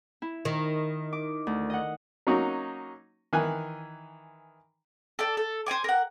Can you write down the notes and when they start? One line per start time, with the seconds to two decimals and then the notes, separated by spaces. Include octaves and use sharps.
0.22 E4
0.45 D#3
1.13 D6
1.47 D2
1.70 D#5 F#5
2.27 F#3 A#3 C#4 D#4 F#4
3.33 D#3 E3 G#5 F#6
5.19 A4 D5
5.37 A4
5.66 C5 C#5 G#5 D6
5.84 A#4 F#5